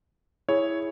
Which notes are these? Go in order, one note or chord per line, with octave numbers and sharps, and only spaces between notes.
E4 G#4 C#5 E5